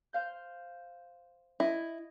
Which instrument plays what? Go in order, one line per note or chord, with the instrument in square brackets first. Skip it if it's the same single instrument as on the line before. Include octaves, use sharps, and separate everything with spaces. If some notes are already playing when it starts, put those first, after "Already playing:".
[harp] C5 F5 G6
[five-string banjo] E4 [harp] D#5